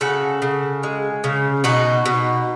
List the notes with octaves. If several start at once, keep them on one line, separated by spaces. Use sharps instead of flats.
C#3 F#4 A4
C#3
G#3
C#3
B2 D#4 F#4
B2